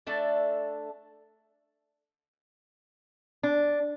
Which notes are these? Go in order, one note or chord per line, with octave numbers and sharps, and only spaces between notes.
A3 D4 A4 D5
D4